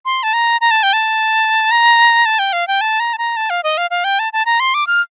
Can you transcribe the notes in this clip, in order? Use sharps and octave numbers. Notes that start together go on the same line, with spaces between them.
C6
A5
A#5
A#5
A5
G5
A5
A#5
A5
G5
F5
G5
A5
A#5
A5
A#5
A5
F5
D#5
F5
F5
G5
A5
A5
A#5
C6
D6
F6